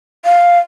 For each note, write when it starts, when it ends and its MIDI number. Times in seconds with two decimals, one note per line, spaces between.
0.25 0.59 77